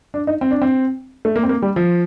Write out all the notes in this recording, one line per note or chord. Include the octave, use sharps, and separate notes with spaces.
D4
D#4
C4
D4
C4
A3
A#3
C4
A#3
G3
F3